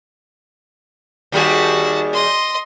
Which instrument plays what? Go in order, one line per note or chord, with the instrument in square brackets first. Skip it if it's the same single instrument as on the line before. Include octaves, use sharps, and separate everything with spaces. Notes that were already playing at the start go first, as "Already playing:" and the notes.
[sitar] D#2 G3 G#4 [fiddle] F#4 A5
[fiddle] D#5 C6